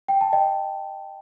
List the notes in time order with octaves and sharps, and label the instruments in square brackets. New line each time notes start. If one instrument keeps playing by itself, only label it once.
[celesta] G5
A5
D#5 G5